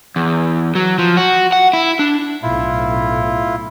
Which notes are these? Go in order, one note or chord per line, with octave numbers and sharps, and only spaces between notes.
E2
F#3
F3
F#4
F#5
E4
D4
B1 A2 E4 F4